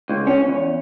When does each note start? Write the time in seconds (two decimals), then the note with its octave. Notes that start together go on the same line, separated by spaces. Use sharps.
0.09 C#2
0.27 C#4
0.47 E2